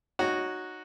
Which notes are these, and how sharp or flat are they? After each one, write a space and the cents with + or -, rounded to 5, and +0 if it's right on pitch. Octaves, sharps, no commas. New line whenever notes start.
D#4 -10 F#4 -5 C#5 +0